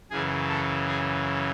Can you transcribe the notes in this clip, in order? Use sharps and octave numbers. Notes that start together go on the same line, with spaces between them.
F#2 C#3 E3 G#4
A4
G#4